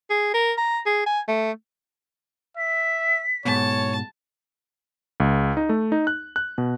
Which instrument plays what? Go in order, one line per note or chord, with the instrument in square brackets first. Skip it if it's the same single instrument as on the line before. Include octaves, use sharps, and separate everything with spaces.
[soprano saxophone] G#4
A#4
A#5
G#4
G#5
A3
[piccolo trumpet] E5 [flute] B6
[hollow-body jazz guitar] G#2 B2 [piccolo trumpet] C#5 [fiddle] A5
[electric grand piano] C#2
D#4
A3
D#4
F#6
F#6
B2